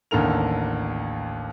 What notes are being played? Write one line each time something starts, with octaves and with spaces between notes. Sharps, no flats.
A1 D#2 D3 A4 A#4 F7